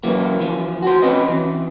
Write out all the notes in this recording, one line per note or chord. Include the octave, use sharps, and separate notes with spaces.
F#2 E3 A#3
E3 F3
F#4 C5
C4 C#4 B4 D#5
E3